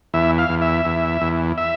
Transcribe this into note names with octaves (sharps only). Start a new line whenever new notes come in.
E2 E5
F5
E2
E5
E2
E2
E5